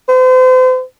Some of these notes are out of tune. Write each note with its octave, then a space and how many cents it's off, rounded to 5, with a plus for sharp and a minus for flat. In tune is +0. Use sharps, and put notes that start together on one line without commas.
C5 -40